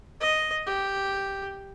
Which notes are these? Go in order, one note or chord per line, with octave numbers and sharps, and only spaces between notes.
D#5
G4